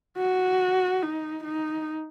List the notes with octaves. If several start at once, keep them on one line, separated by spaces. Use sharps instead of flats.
F#4
D#4
D#4